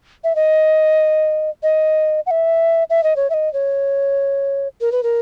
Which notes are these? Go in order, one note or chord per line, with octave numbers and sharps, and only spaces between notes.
E5
D#5
D#5
F#5
E5
E5
D#5
C#5
E5
D#5
C#5
A#4
B4
A#4